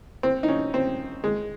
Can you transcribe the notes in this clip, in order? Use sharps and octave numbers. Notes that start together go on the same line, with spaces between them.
C4
D#4
C#4
C4
G#3